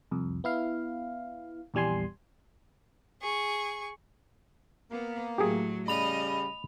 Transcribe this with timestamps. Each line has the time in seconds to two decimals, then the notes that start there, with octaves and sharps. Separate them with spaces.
0.11 C2 F2
0.44 B3 E4 F5
1.74 A#1 E2 G3 G#5 C6
3.21 G#4 C#6
4.91 A#3 B3
5.38 A2 F#3 G4 G#4
5.88 C#3 G3 D#5 B5 F7